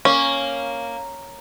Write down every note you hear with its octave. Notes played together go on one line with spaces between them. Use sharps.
A#3 C#4